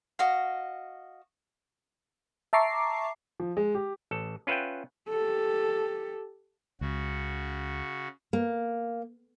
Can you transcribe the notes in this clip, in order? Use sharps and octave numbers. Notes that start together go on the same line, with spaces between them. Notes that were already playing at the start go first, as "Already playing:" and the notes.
F#4 D#5 F5
E5 A5 A#5 C#6 D6 C7
F3
G#3
G4
A1 A4
C#4 F4 B4 E5 F#5 G5
G4 A4
C#2 C#3 F#4
A#3